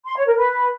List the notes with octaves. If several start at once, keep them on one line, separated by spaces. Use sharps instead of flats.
C6
C#5
A#4
B4